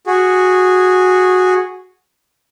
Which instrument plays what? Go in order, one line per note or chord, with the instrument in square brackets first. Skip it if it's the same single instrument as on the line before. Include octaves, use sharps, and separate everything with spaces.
[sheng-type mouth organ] F#4 G#4